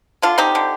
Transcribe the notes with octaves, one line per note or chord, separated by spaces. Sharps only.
D3 D4 F4
C4 D#4 G4
D3